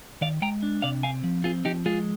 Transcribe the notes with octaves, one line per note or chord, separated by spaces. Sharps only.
D#3 D5 F5
G#3 G5 A#5
D4
C3 D5 F5
C4 F5 G#5
F3
C4 F4 G#4
F3 D#4 G4
G#3 F4 G#4